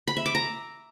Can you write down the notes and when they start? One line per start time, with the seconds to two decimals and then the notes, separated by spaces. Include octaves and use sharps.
0.08 B5
0.17 E5
0.26 D6
0.35 A#5